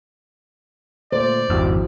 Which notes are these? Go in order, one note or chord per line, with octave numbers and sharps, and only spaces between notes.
A#2 D3 A3 C5 D5
G#1 F2 E4 F#4 G4